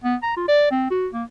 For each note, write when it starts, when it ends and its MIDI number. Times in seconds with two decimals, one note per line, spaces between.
0.04 0.16 59
0.23 0.34 82
0.37 0.47 65
0.48 0.67 74
0.71 0.89 60
0.91 1.07 66
1.13 1.24 58